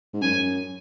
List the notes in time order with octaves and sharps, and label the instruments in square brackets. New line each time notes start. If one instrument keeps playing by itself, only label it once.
[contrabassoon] G#2
[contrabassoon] F#2 [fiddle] G#5